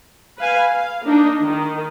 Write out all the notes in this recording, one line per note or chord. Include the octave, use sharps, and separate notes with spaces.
B4 F5 G#5
F5
A#3 D4 D#4
D#3